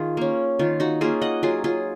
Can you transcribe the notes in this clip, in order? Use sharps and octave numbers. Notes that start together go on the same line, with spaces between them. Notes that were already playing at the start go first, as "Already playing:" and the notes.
Already playing: D#3 F4 G#4
A#3 C#4
D#3 F4
D#4 F#4
A#3 C#4 F4 G#4
D#5 F#5
F#3 F4 G#4
F4 G#4